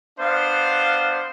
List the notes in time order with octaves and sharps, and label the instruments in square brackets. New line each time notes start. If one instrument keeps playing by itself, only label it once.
[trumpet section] B3 D4 C5 [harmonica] F5